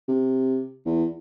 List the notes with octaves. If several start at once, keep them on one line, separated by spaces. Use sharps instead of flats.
C3
E2